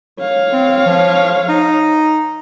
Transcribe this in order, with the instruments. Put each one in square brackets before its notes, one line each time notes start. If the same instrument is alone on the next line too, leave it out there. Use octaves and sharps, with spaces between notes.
[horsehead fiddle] C#5 F5
[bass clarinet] C4
F3
D#4